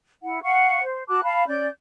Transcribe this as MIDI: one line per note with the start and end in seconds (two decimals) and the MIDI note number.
0.23 0.42 64
0.23 0.42 78
0.43 0.81 77
0.43 0.81 78
0.43 0.81 85
0.82 1.03 72
1.09 1.21 66
1.09 1.21 81
1.09 1.21 86
1.09 1.21 90
1.24 1.44 77
1.24 1.44 81
1.24 1.44 83
1.48 1.67 61
1.48 1.67 74
1.48 1.67 91